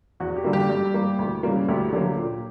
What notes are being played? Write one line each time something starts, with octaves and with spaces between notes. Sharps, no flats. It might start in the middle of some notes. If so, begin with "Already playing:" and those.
E2 F#4
G4
D3 G3 A#3
G4
G2
E3 G3 A#3
D2
C#3 E3 G3 A#3
D2 G4
D3 F#3 A#3
A#2